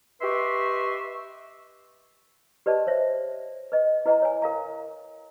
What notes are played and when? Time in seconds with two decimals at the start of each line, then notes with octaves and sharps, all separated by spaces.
0.21 G4 B4 D#5 E5 C6 C#6
2.66 G4 B4 D5 D#5 A5
2.87 C5 C#5 E5
3.72 B4 D#5
4.06 E4 B4 D#5 F#5 G5 A#5
4.22 C#5 G#5
4.42 A#4 F5 A#5